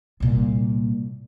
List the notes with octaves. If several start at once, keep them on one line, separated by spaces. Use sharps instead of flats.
C2 A#2